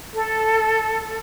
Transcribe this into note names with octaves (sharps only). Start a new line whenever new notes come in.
A4